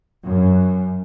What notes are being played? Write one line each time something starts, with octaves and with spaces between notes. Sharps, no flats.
F#2